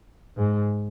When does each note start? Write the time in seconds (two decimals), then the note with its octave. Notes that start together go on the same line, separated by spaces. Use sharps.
0.37 G#2